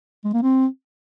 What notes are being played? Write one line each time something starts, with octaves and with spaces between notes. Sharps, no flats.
G#3
A#3
C4